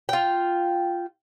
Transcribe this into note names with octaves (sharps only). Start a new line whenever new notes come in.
F4 G5